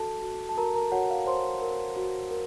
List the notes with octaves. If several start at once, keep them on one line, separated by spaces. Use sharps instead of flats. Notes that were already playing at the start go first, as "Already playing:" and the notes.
Already playing: F#4 A4 A5
F#4
A5
F#4 A#4 A#5
A#4 A#5
F#4 C#5 F#5
F5
C5 C#5 C6
A#4
F#4
A#4